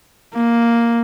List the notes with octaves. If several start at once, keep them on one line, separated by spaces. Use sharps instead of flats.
A#3